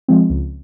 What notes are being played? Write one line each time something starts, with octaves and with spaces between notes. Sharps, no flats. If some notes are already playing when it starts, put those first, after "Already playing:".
F3 G#3 C4
C#2